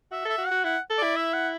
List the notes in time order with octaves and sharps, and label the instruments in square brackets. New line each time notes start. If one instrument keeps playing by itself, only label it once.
[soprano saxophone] F#4 [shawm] E5
[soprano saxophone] A4 [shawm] E5
[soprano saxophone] F#4
[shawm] F#5
[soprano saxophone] F#4
[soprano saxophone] E4 [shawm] F#5
[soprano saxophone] A4
[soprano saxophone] E4 [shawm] D5
[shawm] E5
F#5